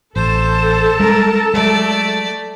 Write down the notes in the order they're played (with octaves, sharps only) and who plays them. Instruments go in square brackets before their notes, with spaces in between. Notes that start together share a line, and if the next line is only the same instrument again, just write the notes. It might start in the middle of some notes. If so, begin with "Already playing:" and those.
[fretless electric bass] A1 [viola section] A4 A5 [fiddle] C5
[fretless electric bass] G3 G#3 C#4 [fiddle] A#4
[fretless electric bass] F#3 G#3 [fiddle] A3 D5